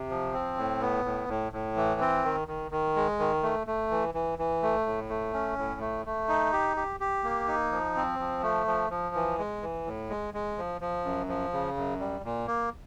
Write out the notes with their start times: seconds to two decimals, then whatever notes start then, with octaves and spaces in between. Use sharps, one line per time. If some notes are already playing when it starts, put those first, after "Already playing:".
Already playing: C3
0.10 F3
0.34 C4
0.58 A2
0.82 B3
1.05 A2
1.29 A2
1.53 A2
1.77 E3
2.01 C4
2.24 D#3
2.48 D#3
2.71 D#3
2.96 G#3
3.19 D#3
3.43 A3
3.67 A3
3.91 E3
4.14 E3
4.39 E3
4.62 A3
4.86 A2
5.09 A3
5.33 C#4
5.58 A2
5.81 A3
6.06 A3
6.29 D#4
6.53 G4
6.77 G4
7.00 G4
7.24 A#3
7.48 D#4
7.72 F3
7.96 C4
8.19 F3
8.43 A3
8.67 F3
8.90 F3
9.15 E3
9.39 G#3
9.63 E3
9.86 A2
10.09 G#3
10.34 G#3
10.58 F3
10.81 F3
11.05 F#2
11.28 F3
11.53 C#3
11.76 F#2
12.00 G3
12.24 A#2
12.47 A#3